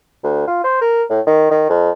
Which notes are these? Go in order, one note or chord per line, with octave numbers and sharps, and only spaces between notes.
D2
F4
C5
A#4
A2
D#3
D#3
F2